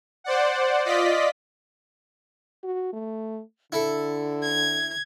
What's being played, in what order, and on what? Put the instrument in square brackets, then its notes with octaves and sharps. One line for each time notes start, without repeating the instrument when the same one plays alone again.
[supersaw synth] C5 D5 F#5
F4 D5 D#5 B6
[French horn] F#4
A3
[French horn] D3 [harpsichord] E4 A4
[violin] G#6